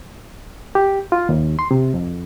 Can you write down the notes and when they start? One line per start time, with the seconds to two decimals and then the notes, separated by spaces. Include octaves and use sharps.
0.75 G4
1.12 F4
1.29 D#2
1.59 C6
1.71 C3
1.94 F2